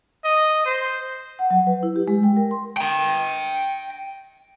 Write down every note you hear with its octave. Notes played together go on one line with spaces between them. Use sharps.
D#5
C5
F#5
F#3
B4
E4
G4
G#3
G5
A#4
C6
G5 A#5